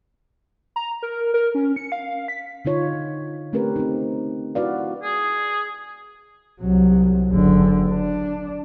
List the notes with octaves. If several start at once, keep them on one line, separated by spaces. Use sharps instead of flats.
A#5
A#4
A#4
C#4
C#7
F5
B6
D3 D#4 F4 C#5
A3 C4 C#4 G4 A#4 B4
C4 D#4
E4 F#4 B4 D5 F5
G#4
C2 F#3
F#1 D3
D4